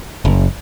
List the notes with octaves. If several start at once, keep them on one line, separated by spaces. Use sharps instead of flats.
F#1